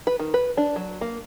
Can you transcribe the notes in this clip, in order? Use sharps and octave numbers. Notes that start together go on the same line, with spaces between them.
B4
D#3
B4
D4
F#3
A#3